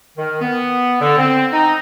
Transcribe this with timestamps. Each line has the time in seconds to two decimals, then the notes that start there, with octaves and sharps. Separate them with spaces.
0.17 D#3
0.41 B3
1.01 D3
1.18 C4
1.52 D#4